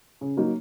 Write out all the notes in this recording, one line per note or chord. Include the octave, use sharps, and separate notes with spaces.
C#3
F#3 A#3 D#4